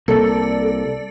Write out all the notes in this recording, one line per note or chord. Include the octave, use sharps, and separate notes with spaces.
C2 A#3 A4 D5